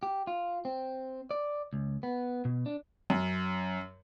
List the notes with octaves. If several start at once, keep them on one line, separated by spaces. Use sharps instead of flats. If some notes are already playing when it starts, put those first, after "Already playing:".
G4
F4
C4
D5
C#2
B3
B2
D4
F#2